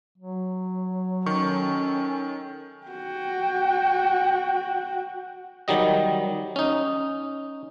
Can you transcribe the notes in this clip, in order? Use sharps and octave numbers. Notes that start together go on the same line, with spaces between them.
F#3
D#3 C#4 A4 C#6
F#4 G5
D#3 F#3 G3 D#5
C#4 D#4